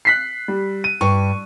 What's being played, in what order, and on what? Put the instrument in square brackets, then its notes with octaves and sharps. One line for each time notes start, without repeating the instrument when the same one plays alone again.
[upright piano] F#6 B6 C7
G3
D#7
[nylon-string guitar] G2 [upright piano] C#6